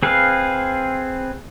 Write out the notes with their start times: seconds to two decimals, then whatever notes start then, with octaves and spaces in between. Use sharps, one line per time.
0.03 C4 G#4 B4 F5